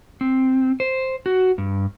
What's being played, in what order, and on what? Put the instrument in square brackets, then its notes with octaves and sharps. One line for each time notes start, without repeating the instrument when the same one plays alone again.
[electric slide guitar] C4
C5
F#4
G2